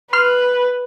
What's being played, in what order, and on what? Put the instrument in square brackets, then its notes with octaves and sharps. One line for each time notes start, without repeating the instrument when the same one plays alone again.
[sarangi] B4 [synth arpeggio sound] C6 F6